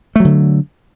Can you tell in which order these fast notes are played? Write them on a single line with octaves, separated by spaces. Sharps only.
A3 F#3 D3